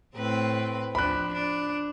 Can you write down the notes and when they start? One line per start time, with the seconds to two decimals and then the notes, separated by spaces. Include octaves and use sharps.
0.16 A2 C4 B4
0.95 F3 D4 B5 F#6
1.34 D4